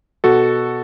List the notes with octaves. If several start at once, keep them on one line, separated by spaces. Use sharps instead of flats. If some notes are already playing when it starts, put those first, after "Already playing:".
B2 F#4 A4